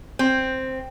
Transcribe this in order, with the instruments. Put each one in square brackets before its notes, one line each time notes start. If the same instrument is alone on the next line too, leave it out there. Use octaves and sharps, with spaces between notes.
[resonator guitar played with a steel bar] C4